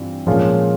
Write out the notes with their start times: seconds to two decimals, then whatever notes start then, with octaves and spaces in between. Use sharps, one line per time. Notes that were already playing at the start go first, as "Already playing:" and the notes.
Already playing: G2 E3 G3 C4 F4
0.27 A#2 F3 G#3 C#4 F4